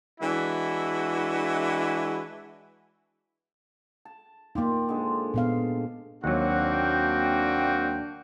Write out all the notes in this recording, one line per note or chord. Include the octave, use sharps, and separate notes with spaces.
E3 G#3 D4 E4 F#4
A5
A#3 D#4 F4 G4 D5
D3 G#3 C5
A#2 B3 F5
D#2 F#3 A#3 C4 D4 F#4 F#5
G5